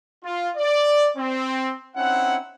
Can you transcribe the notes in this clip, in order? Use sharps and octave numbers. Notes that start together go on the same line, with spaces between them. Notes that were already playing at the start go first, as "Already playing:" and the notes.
F4
D5
C4
C4 C#4 D#4 E4 F#5